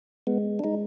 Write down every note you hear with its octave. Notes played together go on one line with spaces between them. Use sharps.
G#3 B3
D4
G#3 D#4